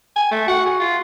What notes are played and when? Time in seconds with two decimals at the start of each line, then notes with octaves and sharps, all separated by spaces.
0.16 G#5
0.31 A3
0.48 F#4 F#5
0.66 G#4
0.80 F4